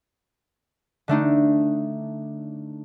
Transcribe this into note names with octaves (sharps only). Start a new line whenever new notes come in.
D3 A3 D4 D#4